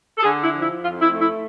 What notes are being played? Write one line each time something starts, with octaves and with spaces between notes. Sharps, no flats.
A4
D3 G#4
E4
F3
E4
F2 F4
E4
A3
E4